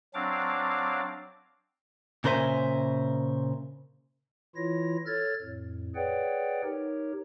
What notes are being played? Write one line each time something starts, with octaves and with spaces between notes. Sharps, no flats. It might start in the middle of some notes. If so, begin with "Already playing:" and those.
F#3 C4 D4 F5 D6
A#2 C#3 A#4 C5 E5 G#5
E3 E4 F4 C#5 A#6
A4 C#5 F6 G#6 A6
F2 A2
G#4 B4 C#5 D5 F#5 G5
D#4 G4 A#4 C#5